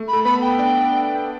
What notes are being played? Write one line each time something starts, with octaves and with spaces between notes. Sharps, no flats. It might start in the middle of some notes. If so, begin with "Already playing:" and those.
Already playing: A3
B5
A4
B3 B4 B5
G5
D4 D5
G5